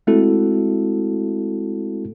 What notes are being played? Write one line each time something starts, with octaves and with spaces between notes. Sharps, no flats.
G#3 A3 C4 E4 F#4 A4